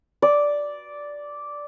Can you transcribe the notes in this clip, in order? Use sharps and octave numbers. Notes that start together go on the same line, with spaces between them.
D5